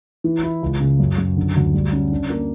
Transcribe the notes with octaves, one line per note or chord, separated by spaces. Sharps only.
E3
E4
C#2
C#3
F#2
F#2
D3
D2
G3
C#4
D4
A#3